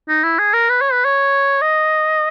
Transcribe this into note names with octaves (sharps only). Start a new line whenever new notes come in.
D#4
E4
G#4
A#4
B4
C#5
B4
C#5
D#5